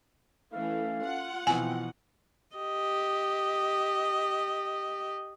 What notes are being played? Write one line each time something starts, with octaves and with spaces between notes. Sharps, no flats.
E3 A3 C#4 A4 F5
F4 F#5
B2 E3 F3 B3 C4 G#5
G4 D#5